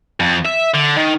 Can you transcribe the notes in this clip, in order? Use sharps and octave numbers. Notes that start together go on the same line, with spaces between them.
F2
E5
D3
D#3